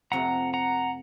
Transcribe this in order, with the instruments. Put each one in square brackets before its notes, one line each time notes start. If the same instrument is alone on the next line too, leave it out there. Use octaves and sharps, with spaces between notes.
[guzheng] F2 C3 F3 A3 C4 [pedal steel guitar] F#5 A#5
[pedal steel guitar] F#5 A#5